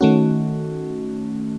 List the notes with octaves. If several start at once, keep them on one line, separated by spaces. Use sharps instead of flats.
D#3 A3 C#4 F#4